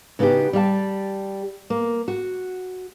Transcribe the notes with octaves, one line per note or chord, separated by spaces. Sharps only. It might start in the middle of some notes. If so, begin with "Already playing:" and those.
C#3 B3 D#4 F#4 G4
G3 G4 F5 A5
A#3
F#4